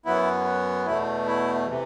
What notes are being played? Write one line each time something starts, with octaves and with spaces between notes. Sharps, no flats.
F#2 F#3 B3 E4
E2 B2 A3 E4
E4
C3 E3